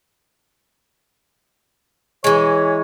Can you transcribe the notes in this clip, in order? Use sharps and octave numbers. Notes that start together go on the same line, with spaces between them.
E3 G#3 C#5